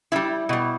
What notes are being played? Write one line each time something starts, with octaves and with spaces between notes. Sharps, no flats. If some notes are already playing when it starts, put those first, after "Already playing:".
A2 G3 E4
B2 G3